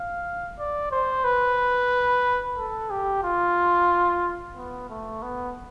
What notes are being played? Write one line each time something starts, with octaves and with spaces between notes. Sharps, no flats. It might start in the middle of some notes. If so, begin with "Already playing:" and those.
Already playing: F5
D5
C5
B4
A4
G4
F4
B3
A3
B3